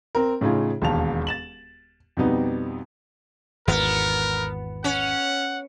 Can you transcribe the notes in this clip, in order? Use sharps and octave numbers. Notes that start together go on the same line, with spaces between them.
C4 A#4
A2 C#3 D#4 F4 G#4
E1 D#2 A5 F7
A6 E7 F#7
F2 B2 G3 B3 D#4
G#1 E2 B3 A#4
C#4 F#5